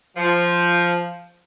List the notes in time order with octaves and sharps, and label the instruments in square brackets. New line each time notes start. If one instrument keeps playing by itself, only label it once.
[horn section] F3